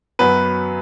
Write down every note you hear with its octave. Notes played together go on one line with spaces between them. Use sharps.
F#2 F#3 B3 B4